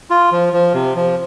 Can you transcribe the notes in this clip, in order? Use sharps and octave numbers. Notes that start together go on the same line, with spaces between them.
F4
F3
F3
C3
F3